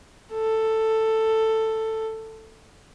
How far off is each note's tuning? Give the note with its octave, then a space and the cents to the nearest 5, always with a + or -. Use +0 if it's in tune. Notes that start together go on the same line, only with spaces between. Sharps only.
A4 +10